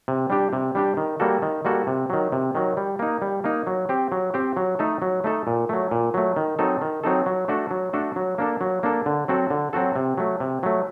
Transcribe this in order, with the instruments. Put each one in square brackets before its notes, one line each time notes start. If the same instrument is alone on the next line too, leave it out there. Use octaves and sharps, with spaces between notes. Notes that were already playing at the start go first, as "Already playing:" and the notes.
[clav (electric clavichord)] C3
G3 D4 G4
C3
G3 D4 G4
D#3
G3 A#3 F#4 A4
D#3
G3 A#3 F#4 A4
C3
D#3 F#3
C3
D#3 F#3
G3
A#3 D#4
G3
A#3 D#4
F#3
C4 G4
F#3
C4 G4
F#3
A3 D#4 A4
F#3
A3 D#4 A4
A#2
F#3 A3
A#2
F#3 A3
D#3
F#3 C4 D#4 A4
D#3
F#3 C4 D#4 A4
F#3
A3 D4 F#4 A4
F#3
A3 D4 F#4 A4
F#3
A#3 D4 A4
F#3
A#3 D4 A4
D3
F#3 C4 F#4 A4
D3
F#3 C4 F#4 A4
C3
F#3 A3
C3
F#3 A3